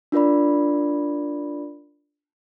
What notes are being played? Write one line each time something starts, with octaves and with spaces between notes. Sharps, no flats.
D4 F4 A#4 D5 B5